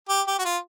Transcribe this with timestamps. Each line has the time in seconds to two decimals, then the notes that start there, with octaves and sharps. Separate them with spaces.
0.09 G4
0.27 G4
0.39 F#4
0.45 F4